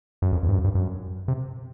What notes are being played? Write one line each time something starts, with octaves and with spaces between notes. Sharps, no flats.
F#2
F2
E2
G2
F#2
G2
F#2
C3